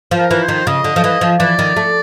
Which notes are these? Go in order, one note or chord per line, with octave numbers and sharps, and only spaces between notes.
F3
A#4
E3
C5
D#3
C#3 D#5
D3
F3
E3
F3
E3 D5
D#3
A3